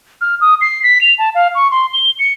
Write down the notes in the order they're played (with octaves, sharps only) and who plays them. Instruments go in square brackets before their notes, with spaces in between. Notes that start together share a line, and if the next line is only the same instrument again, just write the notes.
[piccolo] F6
D#6
C7
B6
F7
A5
F5
C#6
C6
G7
C#7